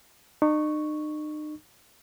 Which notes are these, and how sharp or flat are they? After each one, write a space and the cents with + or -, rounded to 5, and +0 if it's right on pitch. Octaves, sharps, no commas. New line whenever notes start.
D#4 -40 C#6 +0